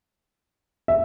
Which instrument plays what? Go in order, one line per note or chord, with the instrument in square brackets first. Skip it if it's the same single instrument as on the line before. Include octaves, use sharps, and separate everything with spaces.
[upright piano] E5